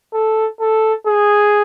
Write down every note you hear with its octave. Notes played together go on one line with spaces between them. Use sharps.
A4
A4
G#4